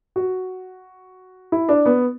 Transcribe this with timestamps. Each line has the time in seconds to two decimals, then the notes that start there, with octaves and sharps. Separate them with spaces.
0.16 F#4
1.52 E4
1.69 D4
1.86 B3